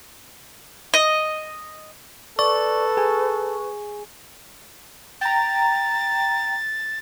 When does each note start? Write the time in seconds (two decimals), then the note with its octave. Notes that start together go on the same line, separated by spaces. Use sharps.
0.94 D#5
2.39 A4 B4 D5 C#6
2.97 G#4 G#5
5.21 G5 A#5 A6